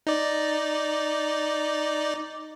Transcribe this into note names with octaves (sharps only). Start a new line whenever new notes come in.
D#4 D5